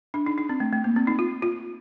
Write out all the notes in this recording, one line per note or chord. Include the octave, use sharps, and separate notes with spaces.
D4
D#4
D#4
C4
A3
A3
A#3
C4
D#4
F4
F4